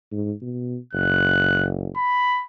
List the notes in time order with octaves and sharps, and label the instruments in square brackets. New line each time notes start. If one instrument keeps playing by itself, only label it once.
[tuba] G#2
B2
[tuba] F#1 [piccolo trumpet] F#6
[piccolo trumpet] B5